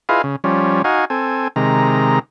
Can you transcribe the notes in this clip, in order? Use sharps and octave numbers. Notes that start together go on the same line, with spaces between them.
E4 F4 G#4 B4 D#5 F5
C#3
F3 G3 C#4
D#4 F#4 F5 G#5
C4 A4 G#5
C3 D#3 G#3 A#5